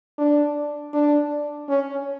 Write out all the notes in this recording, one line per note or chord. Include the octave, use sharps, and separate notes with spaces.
D4
D4
C#4